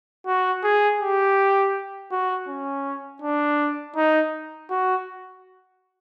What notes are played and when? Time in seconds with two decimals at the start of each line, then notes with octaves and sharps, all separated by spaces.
0.27 F#4
0.64 G#4
1.01 G4
2.11 F#4
2.48 C#4
3.22 D4
3.96 D#4
4.70 F#4